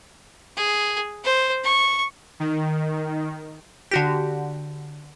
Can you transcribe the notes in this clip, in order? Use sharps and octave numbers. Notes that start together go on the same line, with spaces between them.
G#4
C5
C#6
D#3
D3 F#4 G4